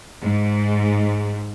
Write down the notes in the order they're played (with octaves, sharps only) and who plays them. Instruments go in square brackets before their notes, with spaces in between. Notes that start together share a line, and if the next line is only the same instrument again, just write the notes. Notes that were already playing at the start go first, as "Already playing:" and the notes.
[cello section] G#2